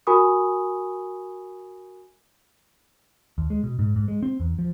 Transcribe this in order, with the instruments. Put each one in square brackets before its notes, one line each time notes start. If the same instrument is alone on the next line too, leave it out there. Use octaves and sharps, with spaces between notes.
[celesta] F#4 A#4 G#5 B5 C#6 D#6
[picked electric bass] D#2
G#3
B2
G#2
G#2
G#3
C4
E2
F3